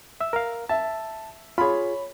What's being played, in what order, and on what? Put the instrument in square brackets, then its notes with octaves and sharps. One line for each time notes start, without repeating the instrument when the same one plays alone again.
[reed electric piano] E5 E6
A#4 F5
[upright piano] E5 [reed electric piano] A5
[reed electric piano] F4 G#4 [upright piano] C#5 B5